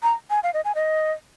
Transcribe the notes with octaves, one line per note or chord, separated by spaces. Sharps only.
A#5
G#5
F5
D#5
G#5
D#5